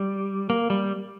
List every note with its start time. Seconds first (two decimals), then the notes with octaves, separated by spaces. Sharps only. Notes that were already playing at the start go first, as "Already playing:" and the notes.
Already playing: G3
0.50 A#3
0.70 G3